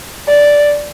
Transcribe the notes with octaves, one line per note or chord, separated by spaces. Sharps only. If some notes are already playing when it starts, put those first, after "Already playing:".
D5